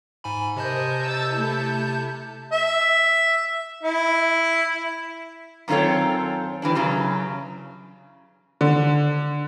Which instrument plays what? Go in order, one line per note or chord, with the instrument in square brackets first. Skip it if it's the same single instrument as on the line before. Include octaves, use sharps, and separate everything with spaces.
[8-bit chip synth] G#2 G#5 B5
[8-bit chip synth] C3 A5 G6 [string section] A#4 C5 D#5
[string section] E6 A6
A3 E4 A4
[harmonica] E5
E4
[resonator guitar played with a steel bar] F#2 D#3 C4 F4 A4 C#5
E3 G3 D4
F#2 C#3 F#3
[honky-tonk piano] D3